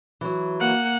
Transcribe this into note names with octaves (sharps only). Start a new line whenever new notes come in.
E3 F#3
A#3 F#5